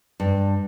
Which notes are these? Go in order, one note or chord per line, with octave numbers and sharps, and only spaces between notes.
G2